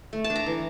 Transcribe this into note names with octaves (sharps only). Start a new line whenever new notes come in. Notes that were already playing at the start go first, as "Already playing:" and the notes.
A3
A5
D4
A#5
E3